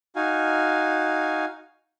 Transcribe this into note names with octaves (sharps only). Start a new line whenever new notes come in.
D#4 F#4 F5 G#5